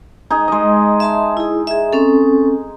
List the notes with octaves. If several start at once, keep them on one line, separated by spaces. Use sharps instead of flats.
D#4 G#4
G#3 D#5
E5 A5 C6
E4 G#4
G#4 E5
C4 C#4 A4